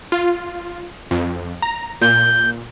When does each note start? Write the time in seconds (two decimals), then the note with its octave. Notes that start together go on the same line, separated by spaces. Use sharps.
0.12 F4
1.11 F2
1.62 A#5
2.01 A#2 G6